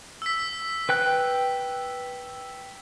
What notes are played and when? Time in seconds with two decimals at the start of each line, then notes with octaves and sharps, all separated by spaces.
0.22 E6 B6
0.89 B4 G5 F#6